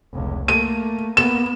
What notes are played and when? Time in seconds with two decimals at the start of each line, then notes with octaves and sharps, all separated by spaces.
0.13 F1 C#2
0.48 A3 A#3 D#7
1.17 A#3 B3 E7